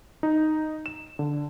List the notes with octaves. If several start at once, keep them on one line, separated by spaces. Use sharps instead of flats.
D#4
E7
D3